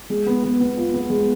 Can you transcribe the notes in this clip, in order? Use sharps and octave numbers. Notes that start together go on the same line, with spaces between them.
G#3
B3
B3
B3
F4
B3
G#3